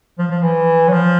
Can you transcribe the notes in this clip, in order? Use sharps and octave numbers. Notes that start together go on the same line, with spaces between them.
F3
F3
E3
F#3
F3